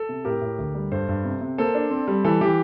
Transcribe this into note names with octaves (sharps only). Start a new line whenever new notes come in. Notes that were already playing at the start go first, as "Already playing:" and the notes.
Already playing: A4
C3
A2 G4 A#4
A2
D2
G3
G2 A4 C5
G2
C3
C3
A#3 A4 C5
D4
C4
G3
E3 A4
E3 G4